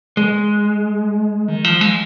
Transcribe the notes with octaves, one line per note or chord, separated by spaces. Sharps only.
G#3
D#3
F3
G#3